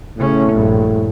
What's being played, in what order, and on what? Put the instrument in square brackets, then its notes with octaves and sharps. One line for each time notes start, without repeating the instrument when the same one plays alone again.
[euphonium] A2 [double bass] C#3 C#4
[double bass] A#1 G2